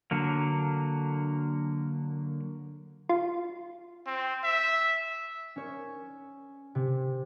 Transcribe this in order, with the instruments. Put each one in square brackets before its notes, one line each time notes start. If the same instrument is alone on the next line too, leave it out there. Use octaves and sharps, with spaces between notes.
[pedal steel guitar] D3 F#3 A#3
[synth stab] F4
[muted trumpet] C4
E5
[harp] C#4 C#5
C3